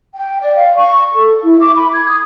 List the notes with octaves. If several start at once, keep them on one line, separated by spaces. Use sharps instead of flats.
G5
D5
F5
C#6
A4
E4
D6
B5
G#6
D#6